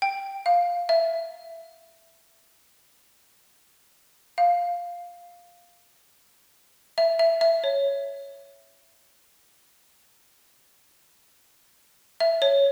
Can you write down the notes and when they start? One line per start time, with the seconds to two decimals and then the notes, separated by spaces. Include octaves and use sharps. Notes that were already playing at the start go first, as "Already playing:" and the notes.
0.02 G5
0.46 F5
0.89 E5
4.38 F5
6.98 E5
7.19 E5
7.41 E5
7.64 C#5
12.20 E5
12.42 C#5